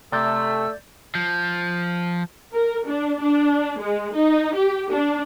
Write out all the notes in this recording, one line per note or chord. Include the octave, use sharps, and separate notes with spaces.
C3 A3 D5 E6 G6 A6
F3
A#4
D4
D4
G#3
D#4
G4
D4